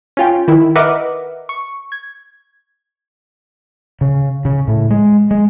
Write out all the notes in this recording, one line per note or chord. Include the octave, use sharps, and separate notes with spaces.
C#4 F4 G5
D#3 E4
A#4 B4 D#5 E5 F#5 D6
C#6
G#6
C#3
C#3
A2
G#3
G#3